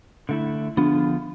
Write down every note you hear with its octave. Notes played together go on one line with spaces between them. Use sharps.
D3 A3 E4
D3 F3 B3 D4 F4